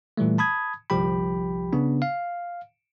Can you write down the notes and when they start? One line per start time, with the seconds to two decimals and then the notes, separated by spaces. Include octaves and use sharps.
0.17 A#2 E3 G3 A3
0.38 A5 B5 D#6 G#6
0.90 G1 C2 F3 G4 G5 B5
1.73 C#3 B3 D4
2.02 F5